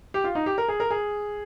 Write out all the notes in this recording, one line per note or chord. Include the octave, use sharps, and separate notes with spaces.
G4
F4
D#4
G4
A#4
G#4
A#4
G#4